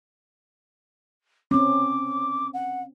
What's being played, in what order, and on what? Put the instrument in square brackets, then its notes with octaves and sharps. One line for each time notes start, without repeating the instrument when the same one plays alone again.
[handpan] C4 C#4 [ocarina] D6
[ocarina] F#5